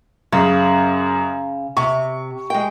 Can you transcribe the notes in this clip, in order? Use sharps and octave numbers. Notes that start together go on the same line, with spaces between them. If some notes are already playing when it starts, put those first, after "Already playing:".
F#2 C#3 G#4
C3 C#6
G#3 G5